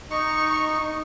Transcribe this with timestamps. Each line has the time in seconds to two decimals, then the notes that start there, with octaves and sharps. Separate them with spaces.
0.11 D#4 C#6